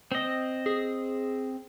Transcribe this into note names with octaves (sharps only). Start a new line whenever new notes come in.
C4 D#5
G#4